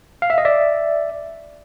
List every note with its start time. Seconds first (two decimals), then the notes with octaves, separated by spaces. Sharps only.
0.22 F5
0.30 E5
0.38 D#5
0.45 D5 E5